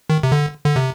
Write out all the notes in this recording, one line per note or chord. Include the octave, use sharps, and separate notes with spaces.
D#3
C3
D3
D3
C3